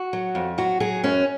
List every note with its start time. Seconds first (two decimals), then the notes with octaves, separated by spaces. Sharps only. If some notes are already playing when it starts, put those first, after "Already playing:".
Already playing: F#4
0.13 F#3
0.35 F2
0.58 F#3 F#4
0.80 F#3 G#4
1.03 F#2 C#4